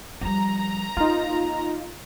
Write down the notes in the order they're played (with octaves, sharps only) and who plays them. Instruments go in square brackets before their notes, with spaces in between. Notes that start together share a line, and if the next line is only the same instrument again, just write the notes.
[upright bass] F3 G3 [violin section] A#5
[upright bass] A#3 [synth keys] D#4 F4